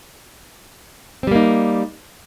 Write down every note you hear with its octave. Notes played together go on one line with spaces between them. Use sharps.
G3 A#3 C4 D#4